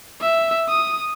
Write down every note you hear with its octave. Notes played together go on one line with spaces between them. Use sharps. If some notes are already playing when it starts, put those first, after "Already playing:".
E5
D#6